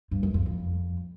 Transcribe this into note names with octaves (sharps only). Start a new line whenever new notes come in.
G2
F#2
F2
F2